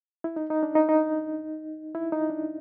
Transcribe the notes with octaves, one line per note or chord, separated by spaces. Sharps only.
E4
D#4
D#4
D4
D#4
D#4
E4
D#4
D4